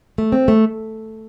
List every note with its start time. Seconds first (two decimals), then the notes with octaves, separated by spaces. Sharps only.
0.18 A3
0.32 C4
0.48 A3